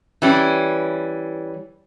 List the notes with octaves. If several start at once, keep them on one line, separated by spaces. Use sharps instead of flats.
E3 G3 C#4